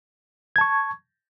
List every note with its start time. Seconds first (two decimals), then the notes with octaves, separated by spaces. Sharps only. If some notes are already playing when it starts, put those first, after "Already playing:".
0.56 G#6
0.58 A5
0.61 C#6